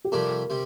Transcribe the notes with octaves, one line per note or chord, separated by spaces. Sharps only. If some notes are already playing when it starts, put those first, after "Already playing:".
G4
F2 C3 G3 D4 A#4
C3 G3